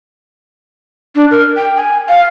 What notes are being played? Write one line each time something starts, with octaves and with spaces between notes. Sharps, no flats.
D4
A#4
G5
G#5
F5